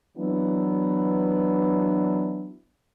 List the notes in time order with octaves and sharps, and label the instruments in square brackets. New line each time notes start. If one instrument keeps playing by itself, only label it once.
[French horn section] E3 F#3 B3 D4 E4